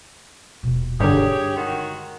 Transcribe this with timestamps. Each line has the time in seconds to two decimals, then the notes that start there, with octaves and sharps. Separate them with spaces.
0.63 D#1 B2
1.00 G2 D3 D#4 G4 G#4 C#5
1.56 D#3 G#3 F#4